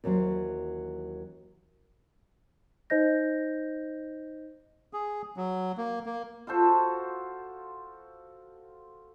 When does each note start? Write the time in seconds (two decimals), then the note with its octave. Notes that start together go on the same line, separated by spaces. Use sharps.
0.04 D#2 E3 F#3 C#4 C5
2.90 D#4 C5 D#5 G6 A#6
4.93 G#4
5.37 F#3
5.78 A#3
6.06 A#3
6.47 F4 F#4 A4 C5